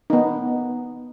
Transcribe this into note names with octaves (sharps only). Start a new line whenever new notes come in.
B3 D#4